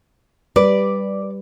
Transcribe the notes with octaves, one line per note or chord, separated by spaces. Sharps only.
G3 B4 D5